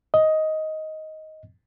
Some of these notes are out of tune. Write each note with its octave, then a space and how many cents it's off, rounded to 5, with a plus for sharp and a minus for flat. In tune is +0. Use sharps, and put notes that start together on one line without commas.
D#5 +10